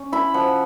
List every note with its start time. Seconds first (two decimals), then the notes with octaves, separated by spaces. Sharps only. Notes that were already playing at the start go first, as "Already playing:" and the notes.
Already playing: C#4
0.12 E4 B5
0.34 F3 F#5